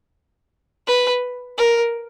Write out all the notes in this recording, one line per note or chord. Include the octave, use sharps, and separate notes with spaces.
B4
A#4